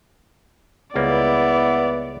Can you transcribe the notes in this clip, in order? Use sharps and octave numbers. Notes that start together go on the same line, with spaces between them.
C#2 G3 A#3 B3 E4 D5